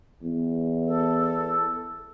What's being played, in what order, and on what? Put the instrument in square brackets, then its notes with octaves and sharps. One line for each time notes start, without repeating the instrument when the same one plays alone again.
[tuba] E2
[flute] A4